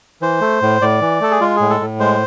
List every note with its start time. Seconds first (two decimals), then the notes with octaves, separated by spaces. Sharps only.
0.22 E3 C5
0.41 A3
0.62 A2
0.82 A2 D5
1.01 E3
1.21 A3 A4
1.31 G#4
1.40 G#3 F4
1.56 A2 G#4
1.70 A4
1.81 A2
2.00 G#3 C5